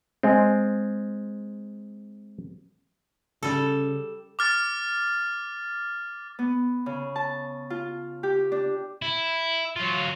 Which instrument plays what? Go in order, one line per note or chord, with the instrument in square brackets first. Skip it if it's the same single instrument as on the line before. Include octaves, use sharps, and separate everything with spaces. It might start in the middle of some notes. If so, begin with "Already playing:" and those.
[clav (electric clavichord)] G#3 C4
[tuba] C#3 [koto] G3 A4
[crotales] D6 F6 A6
[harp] B3
C#3
A5
F4
G4
D4
[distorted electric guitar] E4
F#3 F4